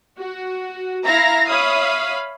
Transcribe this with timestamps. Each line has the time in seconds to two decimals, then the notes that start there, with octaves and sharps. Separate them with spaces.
0.17 F#4
1.04 E4 E5 F5 A#5 A#6
1.48 C#5 E5 F5 B5 D#6